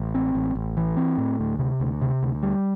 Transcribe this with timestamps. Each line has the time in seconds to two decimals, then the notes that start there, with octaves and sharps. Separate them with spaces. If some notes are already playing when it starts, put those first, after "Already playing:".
Already playing: A1
0.15 C4
0.35 A1
0.55 A1
0.77 E3
0.97 C4
1.18 A2
1.39 D2
1.59 C3
1.80 D2
2.01 C3
2.23 D2
2.43 G3